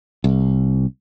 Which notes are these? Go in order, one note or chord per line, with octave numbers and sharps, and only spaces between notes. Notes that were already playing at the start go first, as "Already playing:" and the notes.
C2